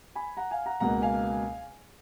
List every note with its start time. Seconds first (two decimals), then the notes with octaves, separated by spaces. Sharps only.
0.15 G#5 B5
0.37 F#5 A#5
0.51 F5 G#5
0.66 F#5 A#5
0.80 C#2 B2 A#3 F#5 A#5
1.02 F5 G#5